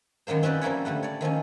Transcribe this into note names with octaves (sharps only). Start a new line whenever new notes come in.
F#2 D#3 F#3 A#3 C5
C4 C#4 F#4 G4 B4 D5
F3 G3 A#3 E4 C#5
D3 G3 A3 F#5
C#5 D5
D#3 F3 C4 C#4